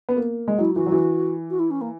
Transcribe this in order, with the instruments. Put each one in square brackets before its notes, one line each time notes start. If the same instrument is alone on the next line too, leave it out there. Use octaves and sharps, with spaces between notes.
[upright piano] B3
A#3
G#3
[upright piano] F#3 [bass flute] E4
[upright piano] E3 [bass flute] F#4
[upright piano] F#3
E3
[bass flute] F#4
E4
C#4
A#3